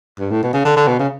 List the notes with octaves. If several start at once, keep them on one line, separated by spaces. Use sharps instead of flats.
G2
A2
B2
C#3
D3
D3
B2
C#3